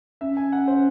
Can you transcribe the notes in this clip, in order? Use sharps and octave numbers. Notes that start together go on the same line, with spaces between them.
C#4 E5
G#5
F#5
C5